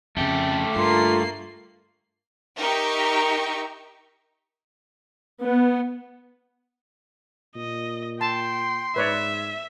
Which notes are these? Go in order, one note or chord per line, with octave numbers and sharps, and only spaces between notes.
F2 C#3 A3 G4
G2 A#3 F4 C7
D#4 G4 A#4 E5 C#6
B3
A#2 D#5
G5 A5 C6
G#2 B4 C#5 D5 E5